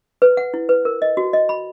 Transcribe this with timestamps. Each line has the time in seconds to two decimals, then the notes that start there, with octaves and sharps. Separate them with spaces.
0.22 B4
0.37 F#5
0.54 E4
0.69 B4
0.85 A#4
1.02 D#5
1.17 F#4
1.33 D#5
1.49 B5